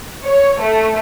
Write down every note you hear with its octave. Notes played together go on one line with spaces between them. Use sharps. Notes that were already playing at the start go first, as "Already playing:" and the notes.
C#5
A3